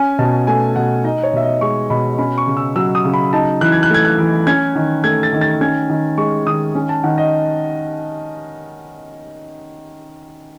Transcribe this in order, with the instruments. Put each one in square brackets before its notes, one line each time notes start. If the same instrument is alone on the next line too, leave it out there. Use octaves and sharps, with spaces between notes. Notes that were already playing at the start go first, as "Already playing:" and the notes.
Already playing: [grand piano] C#4 G#5
B2 A5
A3 G#5
B2 F#5
D#4 D#5
C#5
B2 E5
D#5
G#3 C#6
B2 B5
C#4 B5
C#6
C#3
E6
F#3 E6
D#6
C#3
B5
D#4 A5
E3 F#6
G#6
F#6
A3 G#6
F#6
E3
C#4 G#6
D#3
A3 G#6
A6
D#3
A6
C#4 G#6
D#3
G#3 C#6
D#3 D#6
C#4
A5
D#3 F#5
D#5